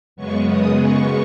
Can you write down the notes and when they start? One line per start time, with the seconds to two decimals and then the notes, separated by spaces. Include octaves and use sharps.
0.16 F#2 C#3 G#3 B3 C#6
0.48 D#6
0.78 C#6